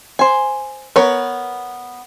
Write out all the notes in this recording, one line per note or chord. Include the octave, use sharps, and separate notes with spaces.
C5 G#5
B3 A#4 B4 C#5